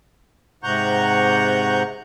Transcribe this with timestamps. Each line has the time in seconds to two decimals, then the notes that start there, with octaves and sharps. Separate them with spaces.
0.63 G#2 C3 F#5 A#5 C#6 G6